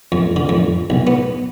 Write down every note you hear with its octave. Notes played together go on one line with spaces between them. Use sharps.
F2
D3
F2
B1
B3